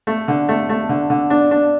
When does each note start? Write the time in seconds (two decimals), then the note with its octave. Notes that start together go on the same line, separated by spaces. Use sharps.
0.07 A3
0.28 D3
0.49 A3
0.69 A3
0.89 D3
1.10 D3
1.30 D4
1.51 D4